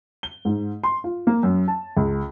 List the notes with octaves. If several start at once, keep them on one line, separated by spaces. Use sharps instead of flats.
G7
G#2
C6
F4
A#3
F#2
A5
C#2